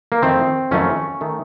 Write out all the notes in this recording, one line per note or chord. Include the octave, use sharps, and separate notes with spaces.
A#3
F2 D#3 A3 C4
F2 D#3 F#3 A3 C#4
D#3 A3